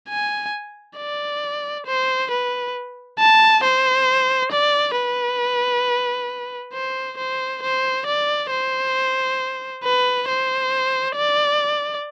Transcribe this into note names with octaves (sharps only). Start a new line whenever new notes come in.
G#5
D5
C5
B4
A5
C5
D5
B4
C5
C5
C5
D5
C5
B4
C5
D5